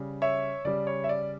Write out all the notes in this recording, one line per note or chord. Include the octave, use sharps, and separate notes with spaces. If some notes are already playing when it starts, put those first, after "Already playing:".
Already playing: C#3 G3
C#5 E5
C#3 G3 D5
C#5
E5
D5